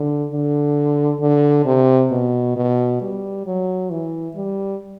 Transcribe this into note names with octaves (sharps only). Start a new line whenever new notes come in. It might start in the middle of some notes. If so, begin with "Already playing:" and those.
Already playing: D3
D3
D3
C3
B2
B2
G3
F#3
E3
G3